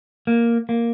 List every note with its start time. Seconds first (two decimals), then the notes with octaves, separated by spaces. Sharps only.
0.27 A#3
0.69 A#3